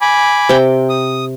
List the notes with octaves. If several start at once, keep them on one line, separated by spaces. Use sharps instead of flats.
G#5 B5 D6
C3 G5
D#6